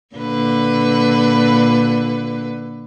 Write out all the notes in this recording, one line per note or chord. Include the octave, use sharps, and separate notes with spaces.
A#2 D3 B4